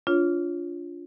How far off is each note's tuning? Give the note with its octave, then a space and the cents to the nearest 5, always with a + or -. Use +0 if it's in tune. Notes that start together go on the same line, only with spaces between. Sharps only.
D4 -30 F4 +0 C#5 +0